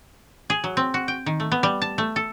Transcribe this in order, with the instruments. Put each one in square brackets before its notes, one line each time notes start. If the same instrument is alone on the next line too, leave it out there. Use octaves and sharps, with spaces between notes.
[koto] G#4
F#3
C4
F#4
G5
D#3
A3
B3
G3
A5
A3
A4